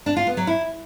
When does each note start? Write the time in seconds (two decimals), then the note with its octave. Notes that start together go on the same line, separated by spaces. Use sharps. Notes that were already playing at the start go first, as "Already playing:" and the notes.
0.06 D4
0.16 F4
0.27 B3
0.37 F#3
0.47 E4